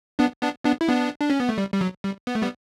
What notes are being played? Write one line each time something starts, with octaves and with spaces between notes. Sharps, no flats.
B3 D4
B3 D4
B3 D4
E4
B3 D4
D4
C#4
B3
A3
G3
G3
F#3
G3
B3
A3
G3 B3